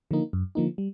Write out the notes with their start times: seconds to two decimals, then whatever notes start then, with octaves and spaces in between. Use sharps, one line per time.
0.11 D3 F3 A#3 D#4
0.33 F#2
0.55 D3 F3 A#3 D#4
0.78 G3